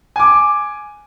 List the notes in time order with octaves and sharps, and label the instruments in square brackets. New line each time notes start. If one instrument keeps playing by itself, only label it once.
[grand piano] G#5 D6